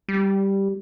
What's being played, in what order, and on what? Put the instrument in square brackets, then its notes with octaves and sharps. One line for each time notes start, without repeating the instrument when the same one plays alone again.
[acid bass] G3